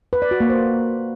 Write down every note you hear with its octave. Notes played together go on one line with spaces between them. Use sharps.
B4
D5
F#4
A#3
C5